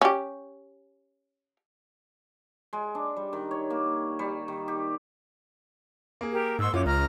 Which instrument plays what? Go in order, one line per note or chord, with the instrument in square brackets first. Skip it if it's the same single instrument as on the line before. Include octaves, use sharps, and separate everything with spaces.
[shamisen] C#4 G4
[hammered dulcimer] G#3
D4
G3
D#3
C#5
A#3
G3
D#3
G4
[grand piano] A#3 G#4
[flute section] G4 A#4
[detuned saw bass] G#2 [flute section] C6 C#6 E6
[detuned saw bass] F#2 [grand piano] F4 [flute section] C#5 D6
[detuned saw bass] C#2 [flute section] A#5 F6